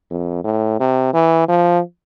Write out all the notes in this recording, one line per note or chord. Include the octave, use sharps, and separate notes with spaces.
F2
A2
C3
E3
F3